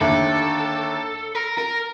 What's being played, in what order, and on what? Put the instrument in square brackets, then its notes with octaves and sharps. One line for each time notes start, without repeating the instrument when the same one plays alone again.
[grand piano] D#2 D3 A3 D4 [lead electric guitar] A4
[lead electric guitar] A#4
A#4